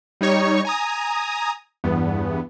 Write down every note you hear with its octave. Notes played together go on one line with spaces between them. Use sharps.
G3 D#4 C#5 C#6
G#5 A#5 D#6
E2 G2 B3